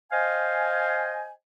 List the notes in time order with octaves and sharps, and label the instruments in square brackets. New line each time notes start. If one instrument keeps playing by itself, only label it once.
[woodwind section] C5 D#5 F5 G5 G#5